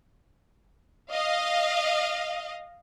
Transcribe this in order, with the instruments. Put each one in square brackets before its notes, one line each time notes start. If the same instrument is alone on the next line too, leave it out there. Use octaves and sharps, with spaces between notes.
[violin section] D#5 F5